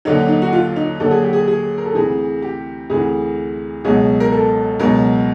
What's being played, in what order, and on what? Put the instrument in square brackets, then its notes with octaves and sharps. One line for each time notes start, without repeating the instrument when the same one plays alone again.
[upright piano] D#2 D3 F#3 D#4
D#4
F#4
F4
D#4
D#2 D3 F#3 A4
G#4
G4
G#4
G#4
A#4
A4
D2 C3 E3 G#4
G4
D2 C3 E3 G#4
C#2 B2 F#3 G#4
A#4
A4
C#2 B2 F#3 A#4